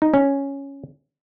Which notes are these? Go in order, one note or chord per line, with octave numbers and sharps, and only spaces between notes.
D#4
C#4